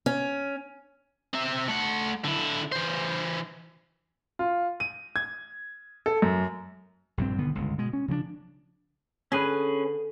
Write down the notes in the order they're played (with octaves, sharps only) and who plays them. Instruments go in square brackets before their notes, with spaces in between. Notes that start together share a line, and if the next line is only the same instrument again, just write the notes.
[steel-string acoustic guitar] C#4
[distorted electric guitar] C4 E5
A3 F#5
D3 E4
E3 C5
[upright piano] F4
D#7
G#6
A4
F#2
[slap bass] A#1 G2 D#3 C4
B1 D3 D#3 B3
G1 C#2
B2 G#3
C#4
C#3 F3 B3 D4
[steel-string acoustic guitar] D3 [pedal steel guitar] C#4 G#4 B4